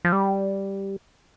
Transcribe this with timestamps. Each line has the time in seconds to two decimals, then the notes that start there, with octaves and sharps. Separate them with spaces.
0.05 F3
0.12 G3